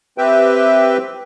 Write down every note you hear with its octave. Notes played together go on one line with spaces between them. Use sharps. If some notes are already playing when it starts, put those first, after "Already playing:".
C4 G4 B4 E5 G5